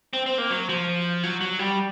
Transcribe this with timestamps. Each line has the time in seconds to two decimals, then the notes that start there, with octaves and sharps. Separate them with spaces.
0.13 C4
0.26 C4
0.38 A#3
0.50 F#3
0.69 F3
1.23 F#3
1.41 F#3
1.59 G3